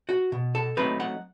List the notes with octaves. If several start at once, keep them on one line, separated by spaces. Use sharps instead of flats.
F#4
B2
A4
F#3 A3 C4 D#4 B4
F#5